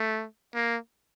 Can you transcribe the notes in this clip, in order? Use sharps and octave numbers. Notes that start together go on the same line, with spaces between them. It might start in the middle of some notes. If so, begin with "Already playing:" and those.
Already playing: A3
A#3